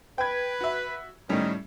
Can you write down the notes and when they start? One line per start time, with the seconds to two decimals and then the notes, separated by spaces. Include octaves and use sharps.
0.18 B4 G5 G#6
0.61 F#4 E5
1.29 A2 D#3 G3 C#4